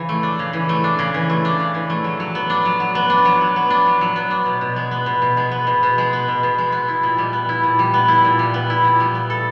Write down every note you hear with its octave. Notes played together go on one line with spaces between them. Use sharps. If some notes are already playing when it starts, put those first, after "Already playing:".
Already playing: C#3 E3
A3
D4
C#3
E3
A3
D4
C#3
E3
A3
D4
C#3
E3
A3
F#3
F#3
B3
D4
F#3
F#3
B3
D4
F#3
F#3
B3
D4
F#3
F#3
B3
D4
B2
B2
G#3
B3
B2
B2
G#3
B3
B2
B2
G#3
B3
B2
B2
G#3
B3
E4
A#2
G3
B3
E4
A#2
G3
B3
E4
A#2
G3
B3
E4
A#2
G3
B3
A4